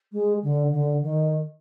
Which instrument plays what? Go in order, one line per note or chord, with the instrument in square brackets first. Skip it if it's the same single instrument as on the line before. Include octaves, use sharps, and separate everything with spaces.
[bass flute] G#3
D3
D3
D#3